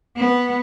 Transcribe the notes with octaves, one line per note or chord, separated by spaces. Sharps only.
B3